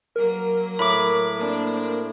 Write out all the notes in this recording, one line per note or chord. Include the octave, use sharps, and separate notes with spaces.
F#3 A#3 A#4
A2 A#5 B5 D6
A#3 C4 D4